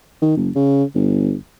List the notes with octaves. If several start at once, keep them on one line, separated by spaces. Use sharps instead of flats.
D#3
F#1
C#3
G1